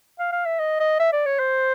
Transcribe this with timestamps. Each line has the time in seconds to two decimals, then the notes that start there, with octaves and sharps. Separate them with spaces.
0.19 F5
0.32 F5
0.45 E5
0.59 D#5
0.80 D#5
0.99 E5
1.13 D5
1.26 C#5
1.39 C5